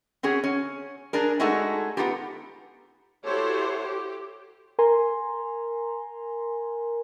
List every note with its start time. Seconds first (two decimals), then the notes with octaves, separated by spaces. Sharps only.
0.23 C4 C#4 F#4 G#4
0.44 C#4
1.13 D4 G#4 A#4
1.40 G#3 A3 D#4 F#4 G#4 A4
1.97 B3 D#4 F4 G4
3.25 E4 F#4 G4 A4 C5 C#5
3.84 G4
4.79 A#4 G#5 A#5 C6